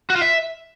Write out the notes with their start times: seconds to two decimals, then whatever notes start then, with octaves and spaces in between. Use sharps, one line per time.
0.10 F#4
0.16 F4
0.22 E5